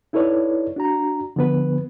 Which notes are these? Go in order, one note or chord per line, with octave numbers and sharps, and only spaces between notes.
D#4 E4 A4 B4 C#5 D5
D4 F#4 A#5
D3 F3 B3 B4